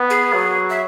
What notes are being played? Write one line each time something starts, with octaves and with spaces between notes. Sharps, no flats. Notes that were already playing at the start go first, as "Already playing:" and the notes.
Already playing: B3
G#4
F#3
E5